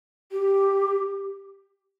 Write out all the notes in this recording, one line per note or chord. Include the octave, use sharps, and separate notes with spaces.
G4